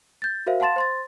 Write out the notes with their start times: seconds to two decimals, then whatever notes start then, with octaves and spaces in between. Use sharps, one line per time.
0.22 G6 A6
0.46 F#4 A#4 C5 E5 F5
0.60 F5 F#5 A5 C6 A6 E7
0.76 C5 C6 A6